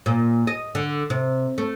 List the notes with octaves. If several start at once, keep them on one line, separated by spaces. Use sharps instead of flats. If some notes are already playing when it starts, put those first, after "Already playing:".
A#2
D#5
D3
C3
A3